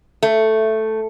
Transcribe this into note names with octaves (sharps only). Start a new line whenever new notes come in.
A3